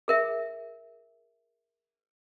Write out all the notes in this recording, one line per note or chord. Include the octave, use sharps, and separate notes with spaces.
G#4 A#4 E5